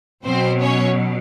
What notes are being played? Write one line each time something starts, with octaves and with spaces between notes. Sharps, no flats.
B2 F#3 C4 C5
C#4 C#5